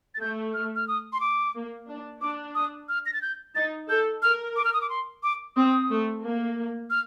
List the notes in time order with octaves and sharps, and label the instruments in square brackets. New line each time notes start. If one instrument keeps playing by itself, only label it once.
[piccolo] A6
[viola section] A3 [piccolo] G6
[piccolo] F6
F6
D#6
C6
D6
[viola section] A#3
D4
[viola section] D4 [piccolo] D6
[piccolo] D#6
F6
A#6
A6
G6
[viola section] D#4 [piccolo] A6
[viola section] A4 [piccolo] G6
[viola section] A#4 [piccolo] F6
[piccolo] D6
F6
D#6
D6
C6
D6
[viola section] C4 [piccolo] D#6
[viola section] A3
A#3
[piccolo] F6